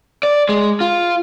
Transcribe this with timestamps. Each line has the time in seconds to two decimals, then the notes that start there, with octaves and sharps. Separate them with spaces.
0.23 D5
0.49 G#3
0.81 F4